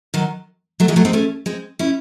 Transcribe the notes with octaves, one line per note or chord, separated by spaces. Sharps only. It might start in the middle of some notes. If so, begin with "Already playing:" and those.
D#3 F#3
F#3 A3
E3 G#3
F#3 A3
C4 D#4
A3 C#4
G#3 C4
C#4 E4